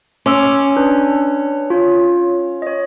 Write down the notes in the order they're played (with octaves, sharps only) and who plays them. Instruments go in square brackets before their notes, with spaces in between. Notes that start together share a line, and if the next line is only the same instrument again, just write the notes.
[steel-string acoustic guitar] C#4 [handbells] C6 D6 E6
[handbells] D4 B4
F4 C#5
C#5 D#5